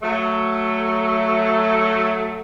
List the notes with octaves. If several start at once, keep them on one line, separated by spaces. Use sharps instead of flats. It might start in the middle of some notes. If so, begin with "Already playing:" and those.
F#3 A3